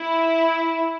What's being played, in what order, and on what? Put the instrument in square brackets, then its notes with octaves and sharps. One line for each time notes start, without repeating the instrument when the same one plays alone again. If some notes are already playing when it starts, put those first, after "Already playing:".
Already playing: [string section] E4